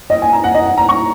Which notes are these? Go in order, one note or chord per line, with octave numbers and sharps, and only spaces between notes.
D#5
G#5
A#5
F#5
D#5
F#5
A#5
C#6